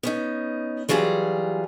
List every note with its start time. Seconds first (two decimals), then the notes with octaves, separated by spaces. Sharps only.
0.03 B3 C#4 D#4
0.89 E3 F#3 G3 F4 G#4